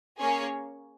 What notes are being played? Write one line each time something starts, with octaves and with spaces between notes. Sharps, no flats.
A#3 C#4 G#4 C#5